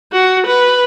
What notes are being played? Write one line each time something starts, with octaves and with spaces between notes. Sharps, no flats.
F#4
B4